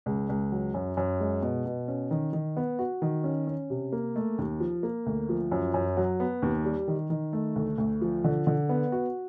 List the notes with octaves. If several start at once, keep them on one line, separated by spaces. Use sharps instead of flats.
C#2
C#2
F#3
F#2
F#2
G#3
B2
B2
C#4
D#3
D#3
B3
F#4
D#3
C#4
C#4
C3
A#3
A3
D#2
F3
A#3
D2
F3
F#2
F#2
F#3
B3
D#2
G3
D#3
D#3
A3
D2
D2
F3
D3
D3
B3
F#4